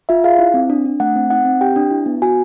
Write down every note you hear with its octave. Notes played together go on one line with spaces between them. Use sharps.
F4 E5
G#4 F5
E4
C4
D4
D4
A3 F#5
C4
D#4 F#5
C4
G4 G5
D4
E4
B3
F#4 G#5